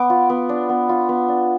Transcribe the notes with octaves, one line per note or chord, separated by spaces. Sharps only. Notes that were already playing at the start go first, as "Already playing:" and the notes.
Already playing: B3 D6
F4
B3
D4
B3
F4
B3
D4